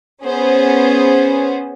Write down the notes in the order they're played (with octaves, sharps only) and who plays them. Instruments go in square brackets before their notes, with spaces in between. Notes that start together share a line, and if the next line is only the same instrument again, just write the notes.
[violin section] B3 C#4 G#4 C5